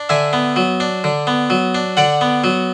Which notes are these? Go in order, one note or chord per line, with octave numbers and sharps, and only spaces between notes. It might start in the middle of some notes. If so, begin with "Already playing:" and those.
Already playing: D4
D3 E5 G#5
B3
F#3
D4
D3
B3
F#3
D4
D3 D5 F#5
B3
F#3